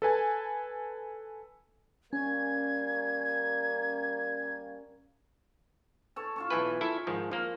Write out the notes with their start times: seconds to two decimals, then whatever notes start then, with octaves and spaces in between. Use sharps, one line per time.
0.02 A4 B4 G#5 A5
2.13 G3 A#3 C#4 G#6
6.16 A4 C#5 A5
6.36 F4 A5 C#6
6.50 B1 E3 B4 G#5 A5
6.81 E4 A4 E5
7.07 G#2 D#3 F3
7.31 F3 A#3 A#4